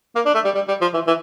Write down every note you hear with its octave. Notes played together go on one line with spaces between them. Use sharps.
A#3
D4
A3
G3
G3
G3
F3
E3
E3